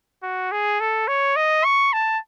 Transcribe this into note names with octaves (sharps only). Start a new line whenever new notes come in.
F#4
G#4
A4
C#5
D#5
C#6
A5